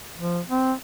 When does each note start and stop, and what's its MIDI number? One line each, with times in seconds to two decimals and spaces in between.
0.19 0.41 53
0.50 0.73 60